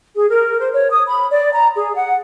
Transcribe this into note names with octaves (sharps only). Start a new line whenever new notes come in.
G#4
A#4
C5
C#5
D#6
B5
D5
A#5
G#4
F#5